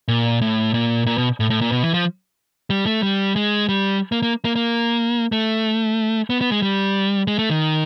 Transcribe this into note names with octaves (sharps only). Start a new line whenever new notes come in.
A#2
A2
A#2
A#2
B2
A2
A2
A#2
B2
E3
F3
G3
A3
G3
G#3
G3
A#3
A#3
A#3
A#3
A3
B3
B3
G#3
G3
G#3
A3
D#3